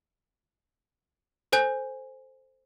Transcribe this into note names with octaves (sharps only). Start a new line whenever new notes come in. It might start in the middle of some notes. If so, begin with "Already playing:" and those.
A4 C5 G#5 G6